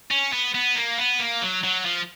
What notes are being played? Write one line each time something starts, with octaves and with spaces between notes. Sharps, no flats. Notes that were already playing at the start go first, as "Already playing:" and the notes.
C#4
B3
B3
A#3
B3
A#3
F#3
F#3
F3